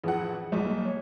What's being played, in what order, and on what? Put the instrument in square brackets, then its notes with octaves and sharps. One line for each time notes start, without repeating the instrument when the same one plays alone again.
[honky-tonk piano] A1 F2 F#5 [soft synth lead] G#4
[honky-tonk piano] B1 G3
[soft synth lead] A#3
C#5